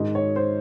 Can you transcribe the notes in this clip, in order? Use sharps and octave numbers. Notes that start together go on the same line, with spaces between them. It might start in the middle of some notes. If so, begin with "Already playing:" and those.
Already playing: G#2 D#3 D#5
C#5
C5